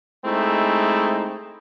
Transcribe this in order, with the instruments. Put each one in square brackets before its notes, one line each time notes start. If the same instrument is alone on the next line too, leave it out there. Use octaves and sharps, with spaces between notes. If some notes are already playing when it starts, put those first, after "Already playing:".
[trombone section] G#3 A3 C4 D#4 E4